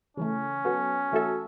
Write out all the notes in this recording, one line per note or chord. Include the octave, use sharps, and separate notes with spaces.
C#3 E3 A3 C#4
F#3 B3 F#4 A4
E3 A3 F#4 A4 E5